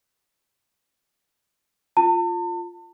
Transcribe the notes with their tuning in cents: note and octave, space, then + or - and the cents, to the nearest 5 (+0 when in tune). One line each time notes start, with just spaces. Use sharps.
F4 +0 A5 +40